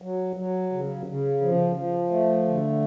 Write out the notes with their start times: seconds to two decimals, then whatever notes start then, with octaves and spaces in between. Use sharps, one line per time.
0.02 F#3
0.36 F#3
0.72 C#3
1.06 C#3
1.41 F3
1.76 F3
2.10 A3
2.46 D3